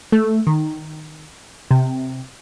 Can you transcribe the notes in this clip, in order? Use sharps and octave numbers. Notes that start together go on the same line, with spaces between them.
A3
D#3
C3